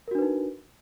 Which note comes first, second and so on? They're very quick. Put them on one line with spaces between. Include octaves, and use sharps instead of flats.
A#4 F#4 D4 B4 D#4